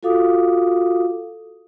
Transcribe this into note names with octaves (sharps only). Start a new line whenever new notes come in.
F4 F#4 A4 F5 D6 D#6